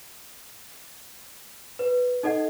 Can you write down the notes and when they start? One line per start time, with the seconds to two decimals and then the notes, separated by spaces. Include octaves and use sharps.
1.79 B4
2.23 D#4 A4 D#5 F#5 G#6